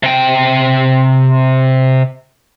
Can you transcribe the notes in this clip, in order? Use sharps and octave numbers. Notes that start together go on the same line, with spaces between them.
C3 G5